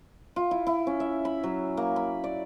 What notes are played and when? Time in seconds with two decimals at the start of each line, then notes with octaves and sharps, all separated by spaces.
0.36 F4
0.51 E4
0.67 E4
0.87 C#4
1.00 E5
1.25 B5
1.43 F#3
1.77 A#3
1.96 B5
2.24 D5